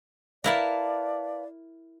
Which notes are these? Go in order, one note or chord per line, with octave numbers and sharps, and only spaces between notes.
E4 A#4 B4 D5 F5 A5